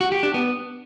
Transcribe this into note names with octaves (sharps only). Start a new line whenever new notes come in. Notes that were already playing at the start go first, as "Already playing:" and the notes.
F#4
G4
D4
B3